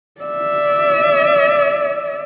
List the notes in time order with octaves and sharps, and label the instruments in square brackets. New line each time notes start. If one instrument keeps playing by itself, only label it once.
[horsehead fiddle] D5 E5